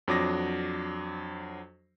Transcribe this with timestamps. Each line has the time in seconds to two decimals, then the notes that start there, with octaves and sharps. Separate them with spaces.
0.08 F2 F#3 D4 D6 D#6 A#6